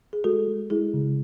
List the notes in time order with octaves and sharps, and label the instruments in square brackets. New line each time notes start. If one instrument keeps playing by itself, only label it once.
[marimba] G#4
[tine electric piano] G#3 [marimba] F#4 A4
[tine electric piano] G#3
[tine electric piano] G#3 [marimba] E4 G#4
[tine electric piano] C#3